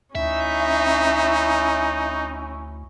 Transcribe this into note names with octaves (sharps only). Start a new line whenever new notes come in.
D2 C#4 D#4 E4 E5